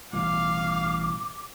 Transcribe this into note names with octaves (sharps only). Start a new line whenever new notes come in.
A1 B2 G3 F5 D6